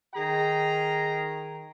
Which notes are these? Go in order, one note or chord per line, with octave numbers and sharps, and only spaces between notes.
D#3 G#4 G5 A#5